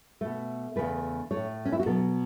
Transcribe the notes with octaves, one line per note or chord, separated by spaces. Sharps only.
B2 A3
E2 C#3 A3 B4
A3 C#5
A2
C#4
E4
F#4
B2 F#3 B3 A4